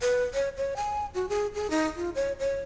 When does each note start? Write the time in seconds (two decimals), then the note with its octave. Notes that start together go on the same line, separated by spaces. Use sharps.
0.01 B4
0.34 C#5
0.57 C#5
0.76 G#5
1.14 F#4
1.29 G#4
1.54 G#4
1.70 D#4
1.96 F4
2.15 C#5
2.39 C#5